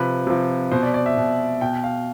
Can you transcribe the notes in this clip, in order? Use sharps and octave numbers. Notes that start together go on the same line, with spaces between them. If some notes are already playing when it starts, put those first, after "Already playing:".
Already playing: C3 F3 B4
C3 F3
B2 C5
D5
D5
E5
B2
B2 G5
F5